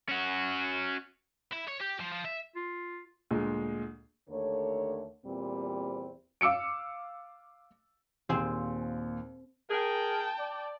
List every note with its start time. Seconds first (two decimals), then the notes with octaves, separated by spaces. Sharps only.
0.09 C#4 F#4
1.53 E4
1.68 C#5
1.81 G4
2.00 F3
2.12 F3
2.25 E5
2.56 F4
3.31 D2 A#2 G#3
4.30 D#2 D3 A3 A#4 C#5
5.26 E2 A#2 G3 C4
6.41 F5 D6 E6 C#7 D7
8.29 D#2 A#2 C4 G#4
9.70 G#4 A#4 G5 A5
10.38 D5